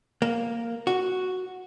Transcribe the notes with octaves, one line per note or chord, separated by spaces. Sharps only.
A#3
F#4